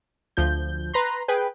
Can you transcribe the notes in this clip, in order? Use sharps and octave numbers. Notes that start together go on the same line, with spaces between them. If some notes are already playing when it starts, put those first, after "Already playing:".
D2 F3 G6
B4 A#5 C6
G#4 B4 G5